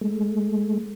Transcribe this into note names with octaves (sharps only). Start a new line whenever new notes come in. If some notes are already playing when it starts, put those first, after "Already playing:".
G#3 A3